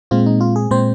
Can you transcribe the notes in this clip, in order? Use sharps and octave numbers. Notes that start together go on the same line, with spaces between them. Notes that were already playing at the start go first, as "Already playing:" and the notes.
A#2 G#3 C4 F4
D#4
F4
G#4
A#2 G#3 C4 C5